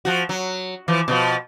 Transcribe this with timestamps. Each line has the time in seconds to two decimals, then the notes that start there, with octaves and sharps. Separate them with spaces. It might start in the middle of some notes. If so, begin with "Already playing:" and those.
0.05 F3 F#4
0.29 F#3
0.88 E3 F3
1.08 B2 D3 F3